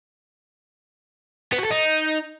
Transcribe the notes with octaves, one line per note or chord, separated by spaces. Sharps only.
B3
F#4
A4
D#4